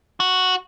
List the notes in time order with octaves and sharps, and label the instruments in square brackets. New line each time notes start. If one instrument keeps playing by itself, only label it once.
[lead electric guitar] F#4